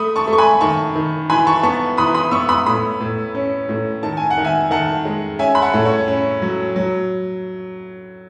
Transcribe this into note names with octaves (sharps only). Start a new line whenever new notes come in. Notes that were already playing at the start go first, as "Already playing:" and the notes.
Already playing: A3 B5 D#6
A5 C#6
A3
C#6
G#5 B5
D#3 A5 C#6
D#3
E3 G#5 B5
A5 C#6
B3 A5 C#6
E3 B5 D#6
B5 D#6
B3 C#6 E6
B5 D#6
A2 B5 D#6
A2
C#4
A2
D#3 A5
G#5
F#5
D#3
E5 G#5
D#3 F#5 A5
G#3
C#4 E5 G#5
B5
F#5 A5
A2
C#5
C#4
F#3
F#3